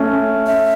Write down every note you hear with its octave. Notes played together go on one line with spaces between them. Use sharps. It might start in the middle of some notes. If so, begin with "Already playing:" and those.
Already playing: A3 C#4
E5